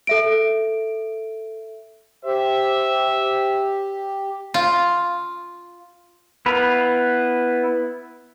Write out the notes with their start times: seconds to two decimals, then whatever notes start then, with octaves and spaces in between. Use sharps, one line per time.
0.07 A4 E5 D7
2.25 G4 C5 E5
4.54 F4
6.46 B3 E4 B4 F5